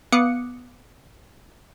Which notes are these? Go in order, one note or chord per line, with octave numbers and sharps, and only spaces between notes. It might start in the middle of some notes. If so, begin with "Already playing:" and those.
B3 F5 D6 D#6 F#6 C#7